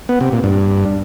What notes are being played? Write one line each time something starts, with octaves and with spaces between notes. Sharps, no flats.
B3
C3
A#2
G2